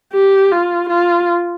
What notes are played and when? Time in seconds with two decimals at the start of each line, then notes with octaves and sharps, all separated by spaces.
0.13 G4
0.51 F4
0.90 F4